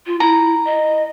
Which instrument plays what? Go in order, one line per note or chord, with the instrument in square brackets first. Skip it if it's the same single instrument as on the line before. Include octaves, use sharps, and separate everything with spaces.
[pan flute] F4
[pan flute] E4 [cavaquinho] A#5
[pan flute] D#5